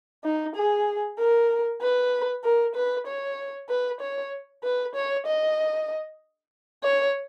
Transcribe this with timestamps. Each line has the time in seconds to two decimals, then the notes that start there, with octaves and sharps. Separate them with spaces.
0.24 D#4
0.55 G#4
1.18 A#4
1.81 B4
2.44 A#4
2.75 B4
3.07 C#5
3.69 B4
4.01 C#5
4.63 B4
4.95 C#5
5.26 D#5
6.83 C#5